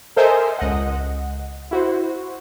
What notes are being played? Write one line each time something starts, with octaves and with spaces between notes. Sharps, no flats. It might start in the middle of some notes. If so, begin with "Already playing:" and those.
A4 A#4 C5 D#5 E5 G#5
C#2 D#5 F#5
E4 F#4 C5